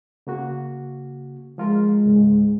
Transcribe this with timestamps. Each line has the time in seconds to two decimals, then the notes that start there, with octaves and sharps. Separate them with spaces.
0.27 C#3 A#3 F#4
1.58 F3 G#3 F4 A#4
2.06 C#2 G#2